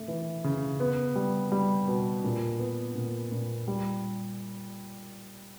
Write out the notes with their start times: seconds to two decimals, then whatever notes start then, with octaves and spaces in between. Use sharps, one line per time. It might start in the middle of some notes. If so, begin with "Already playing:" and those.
Already playing: A3
0.08 E3
0.44 C#3
0.80 B3
1.15 G3
1.52 G3
1.88 B2
2.24 A#2
2.59 B3
2.95 A#2
3.32 A#2
3.68 G3